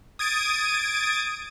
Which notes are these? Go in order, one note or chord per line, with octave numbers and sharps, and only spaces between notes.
D#6 G#6 A6 D7 D#7